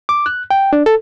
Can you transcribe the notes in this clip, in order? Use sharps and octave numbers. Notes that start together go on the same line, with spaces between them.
D6
F#6
G5
D4
A4